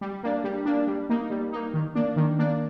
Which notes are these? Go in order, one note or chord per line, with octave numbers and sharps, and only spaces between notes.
G3
A#3 D4
G3
A#3 D4
G3
A#3 D#4
G3
A#3 D#4
D#3
A#3 D4
D#3
A#3 D4